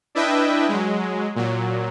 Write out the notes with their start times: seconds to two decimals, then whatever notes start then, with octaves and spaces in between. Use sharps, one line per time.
0.15 D4 E4 B4 D#5 E5 G5
0.69 F#3 G#3
1.36 A#2 F#3